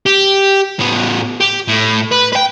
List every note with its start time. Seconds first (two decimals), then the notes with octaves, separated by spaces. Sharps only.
0.06 G4
0.79 A2 B3
1.41 G4
1.68 A2
2.11 B4
2.32 B4 G5